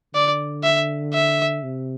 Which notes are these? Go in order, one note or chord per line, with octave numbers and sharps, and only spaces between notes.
D3 D5
E5
E5
C3